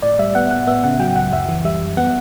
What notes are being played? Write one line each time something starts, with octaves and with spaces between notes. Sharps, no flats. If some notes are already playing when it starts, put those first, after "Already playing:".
A2 D5
G3 E5
B3 F#5
A2 F#5
B3 E5
C#3 F#5
F#3 G5
C#2 F#5
F#2 E5
E3
G3 E5
F#2
B3 F#5